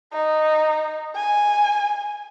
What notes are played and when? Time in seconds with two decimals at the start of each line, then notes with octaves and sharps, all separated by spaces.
0.13 D#4
1.16 G#5